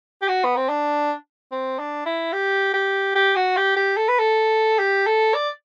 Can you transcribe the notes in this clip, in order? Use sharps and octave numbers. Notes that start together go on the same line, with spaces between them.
G4
F#4
B3
C4
D4
C4
D4
E4
G4
G4
G4
F#4
G4
G4
A4
B4
A4
G4
A4
D5